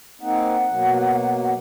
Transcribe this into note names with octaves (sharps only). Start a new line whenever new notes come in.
A#3 C4 D#4 F#5
B2 F#3 A#3